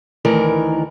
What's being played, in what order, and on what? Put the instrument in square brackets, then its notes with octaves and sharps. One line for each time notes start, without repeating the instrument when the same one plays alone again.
[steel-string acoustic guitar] D2 D#3 E3 A#4